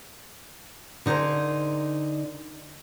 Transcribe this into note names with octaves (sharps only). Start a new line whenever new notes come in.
D3 D#4 G#4 A#4 C5